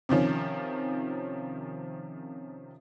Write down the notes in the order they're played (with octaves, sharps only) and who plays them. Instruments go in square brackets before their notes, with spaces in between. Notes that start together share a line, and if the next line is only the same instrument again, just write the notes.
[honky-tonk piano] C3 D#3 F3 C#4